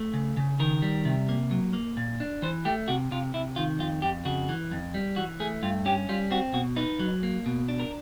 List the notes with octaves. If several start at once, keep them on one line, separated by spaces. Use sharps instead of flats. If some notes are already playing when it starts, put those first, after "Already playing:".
Already playing: A3
C#3
C#3
D#3 A#4
G3
C3
A#3
F#3
A#3
A#2
D4
E3 C5
A3 G4
C3 F#4
C3 F4
C3 E4
D#3 F4
F2 F4
F2 G4
C#3 F#4
E3
F2
G3
E3 F#4
A3 G#4
G2 F4
C#4 G4
G3 F4
C4 F#4
B2 F#4
D#4 B4
F#3
A#3
B2
D4
A#4